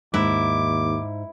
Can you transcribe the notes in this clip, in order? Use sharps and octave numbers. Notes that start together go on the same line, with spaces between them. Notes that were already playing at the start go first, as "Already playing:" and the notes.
D#2 G#2 E4 D6